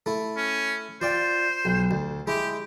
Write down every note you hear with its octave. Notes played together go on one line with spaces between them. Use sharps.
A3 E4
C#4
F4 C5 D5 G5
B1
D2
G#3 E4 G4